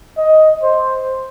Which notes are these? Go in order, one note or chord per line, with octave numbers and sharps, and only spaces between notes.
D#5
C5